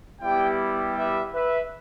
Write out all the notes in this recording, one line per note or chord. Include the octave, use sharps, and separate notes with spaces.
G3 B3 E4 G4 D5 G5
B4 E5
B4 E5